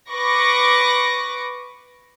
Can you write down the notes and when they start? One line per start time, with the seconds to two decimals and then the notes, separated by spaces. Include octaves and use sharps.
0.10 B4 C#6 D6 A#6